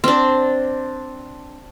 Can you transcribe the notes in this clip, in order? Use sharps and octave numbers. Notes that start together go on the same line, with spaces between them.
C4 D4